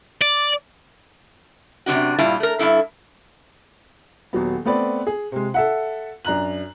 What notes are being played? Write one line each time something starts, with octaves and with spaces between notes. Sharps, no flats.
D5
F#2 C3 E3 D4 F#4
G2 A#2 G3 E4 F4 A5
A3 A#4
G2 D#3 E4 A4
D#1 F#3 B3
A3 B3 C4 B4 D5
G#4
C3 G#3
A4 E5 F#5
F#2 D4 A#5 F#6 F#7